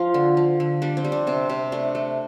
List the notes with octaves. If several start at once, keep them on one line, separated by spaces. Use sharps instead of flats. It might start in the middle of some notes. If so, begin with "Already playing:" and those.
Already playing: F3 F4
D3
F3
D3
G3 D4
C4
G3
D4
C3 C4
C3
A3 D4
A3